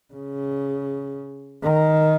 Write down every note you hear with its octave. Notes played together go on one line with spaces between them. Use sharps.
C#3
D#3